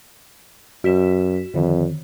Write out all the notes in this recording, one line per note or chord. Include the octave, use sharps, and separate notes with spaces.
F#2 F#4 B6 E7
F2 D3 D#3